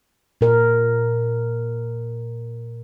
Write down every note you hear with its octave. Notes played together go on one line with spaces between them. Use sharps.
A#2 A#4